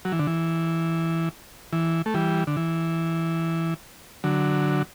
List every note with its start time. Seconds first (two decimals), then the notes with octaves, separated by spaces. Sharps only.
0.05 F#3
0.12 E3
0.19 D3
0.27 E3
1.73 E3
2.06 A3
2.14 E3 G3
2.47 D3
2.57 E3
4.24 D3 F#3